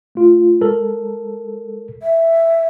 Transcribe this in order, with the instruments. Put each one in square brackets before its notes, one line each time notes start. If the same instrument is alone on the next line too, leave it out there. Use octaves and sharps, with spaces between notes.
[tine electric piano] A3 F4
G#3 A4 A#4
[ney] E5